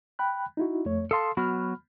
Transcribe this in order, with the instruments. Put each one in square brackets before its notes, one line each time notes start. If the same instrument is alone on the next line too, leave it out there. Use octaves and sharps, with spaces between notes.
[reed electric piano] G5 B5 F#6
D#4 E4 F#4
F2 A3 C#5
[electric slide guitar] A4 F5 A5 [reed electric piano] C6 D#6
[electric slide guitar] F#3 B3 F#4 [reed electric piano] B5 F6